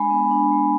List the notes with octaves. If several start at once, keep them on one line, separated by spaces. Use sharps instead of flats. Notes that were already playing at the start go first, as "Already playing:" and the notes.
Already playing: G#3 D4 G#5 B5
B3
D4
G#3